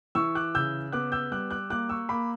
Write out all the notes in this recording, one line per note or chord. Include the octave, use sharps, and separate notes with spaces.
E3 C#6 E6
D6 F#6
C#3 E6 G6
B3 D6 F#6
E6 G6
G3 D6 F#6
D6 F#6
A#3 D6 F#6
C#6 E6
A#3 B5 D6